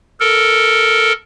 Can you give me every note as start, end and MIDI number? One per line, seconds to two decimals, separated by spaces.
0.20 1.13 69
0.20 1.13 70